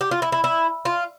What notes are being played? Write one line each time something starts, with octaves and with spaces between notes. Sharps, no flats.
G4
F4
E4
E4
E4
F4